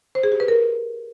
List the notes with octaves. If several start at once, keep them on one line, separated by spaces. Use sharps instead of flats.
C5
G#4
G4
B4
A#4